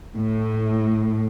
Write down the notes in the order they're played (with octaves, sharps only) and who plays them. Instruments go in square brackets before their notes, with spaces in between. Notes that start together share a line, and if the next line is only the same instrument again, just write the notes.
[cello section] A2